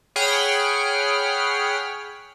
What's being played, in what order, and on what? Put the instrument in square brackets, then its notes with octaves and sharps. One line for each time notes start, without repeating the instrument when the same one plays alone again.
[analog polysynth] G#4 C#5 F#5 G5 B5 F6